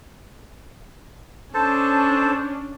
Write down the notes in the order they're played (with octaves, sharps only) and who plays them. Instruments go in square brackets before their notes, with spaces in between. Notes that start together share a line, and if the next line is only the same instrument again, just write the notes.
[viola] C#4 D4 [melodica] A4 C5 A5